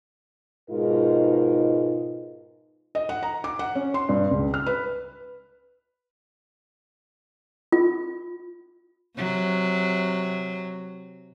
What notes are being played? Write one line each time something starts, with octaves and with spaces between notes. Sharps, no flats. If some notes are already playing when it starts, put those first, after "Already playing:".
G#2 B2 G#3 D#4 F4 A#4
D#5
F#5
A#5
D6
F#5
C#4
C6
G2
C#2
F6
B4
F4
C3 F#3